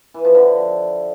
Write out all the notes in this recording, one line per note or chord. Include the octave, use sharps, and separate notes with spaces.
E3
F3
D3